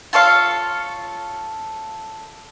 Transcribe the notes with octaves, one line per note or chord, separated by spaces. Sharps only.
F4 A4 C#5 F5